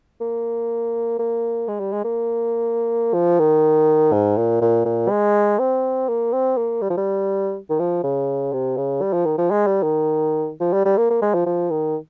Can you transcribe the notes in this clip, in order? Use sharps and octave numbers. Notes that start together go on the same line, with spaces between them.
A#3
A#3
G#3
G3
G#3
A#3
F3
D#3
G#2
A#2
A#2
A#2
G#3
C4
A#3
C4
A#3
G3
F3
G3
D#3
F3
C#3
C3
C#3
G3
F3
D#3
F3
G#3
G3
D#3
F3
G3
G3
A#3
A#3
G#3
F3
F3
D#3